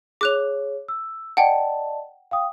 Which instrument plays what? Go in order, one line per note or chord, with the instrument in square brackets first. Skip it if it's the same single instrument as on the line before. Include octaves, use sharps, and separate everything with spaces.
[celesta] G#4 C#5 [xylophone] D6 F#6 F7
[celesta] E6
[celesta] D5 D#5 A5 [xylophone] F#5 G5
[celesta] F5 G5 D#6